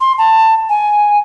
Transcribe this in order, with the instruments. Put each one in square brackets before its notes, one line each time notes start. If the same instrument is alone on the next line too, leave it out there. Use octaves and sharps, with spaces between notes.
[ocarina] C6
A5
G#5